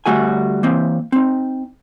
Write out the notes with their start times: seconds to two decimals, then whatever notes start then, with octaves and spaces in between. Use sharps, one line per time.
0.06 D2 G3 A3 F#4 G#4 G#5
0.63 E3 A#3 C4
1.12 C4 D#4